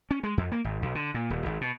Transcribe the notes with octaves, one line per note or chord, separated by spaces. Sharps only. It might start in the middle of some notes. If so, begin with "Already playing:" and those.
C#4
G#3
F2
A#3
G#1
B1
D3
A#2
D#1
G#1
B2